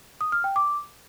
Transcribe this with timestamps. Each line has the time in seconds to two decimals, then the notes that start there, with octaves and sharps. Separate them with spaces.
0.21 D#6
0.32 F6
0.44 G5
0.56 D6